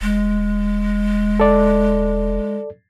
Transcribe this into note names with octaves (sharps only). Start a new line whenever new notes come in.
E1 G#3
A4 D5